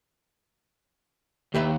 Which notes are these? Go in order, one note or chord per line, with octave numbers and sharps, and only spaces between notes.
D#2 G4 B4 E5